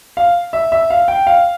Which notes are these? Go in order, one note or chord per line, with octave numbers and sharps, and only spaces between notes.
F5
E5
E5
F5
G5
F5